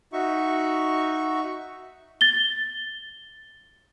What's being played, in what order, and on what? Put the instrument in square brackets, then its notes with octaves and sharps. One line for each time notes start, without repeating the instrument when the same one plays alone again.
[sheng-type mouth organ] D#4 F#4 E5 C#6
[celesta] A6 G7